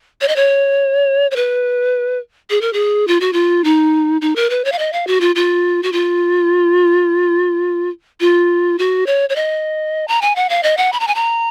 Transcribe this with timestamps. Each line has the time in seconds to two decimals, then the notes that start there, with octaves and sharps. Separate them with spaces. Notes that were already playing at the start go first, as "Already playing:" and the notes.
0.21 C#5
0.28 D#5
0.36 C#5
1.31 C#5
1.36 B4
2.50 G#4
2.61 A#4
2.73 G#4
3.07 F4
3.20 F#4
3.33 F4
3.64 D#4
4.21 D#4
4.36 A#4
4.50 B4
4.65 C#5
4.72 F5
4.79 D#5
4.93 F5
5.07 F#4
5.21 F4
5.35 F4
5.83 F#4
5.92 F4
8.21 F4
8.79 F#4
9.07 C#5
9.29 C#5
9.36 D#5
10.08 A#5
10.22 G#5
10.36 F#5
10.49 F5
10.63 D#5
10.77 F#5
10.92 B5
11.00 A#5
11.07 G#5
11.15 A#5